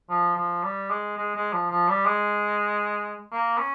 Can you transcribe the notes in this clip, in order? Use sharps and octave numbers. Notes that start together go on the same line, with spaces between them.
F3
F3
G3
G#3
G#3
G#3
F3
F3
G3
G#3
A#3
C#4